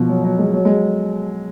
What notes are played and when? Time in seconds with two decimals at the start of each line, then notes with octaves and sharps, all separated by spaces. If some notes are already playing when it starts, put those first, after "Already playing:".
Already playing: B2 F3
0.09 F#3
0.24 F#3
0.39 G#3
0.53 F#3
0.65 G#3